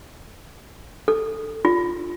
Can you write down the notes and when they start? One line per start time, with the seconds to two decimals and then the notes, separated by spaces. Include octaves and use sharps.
1.08 A4
1.65 F4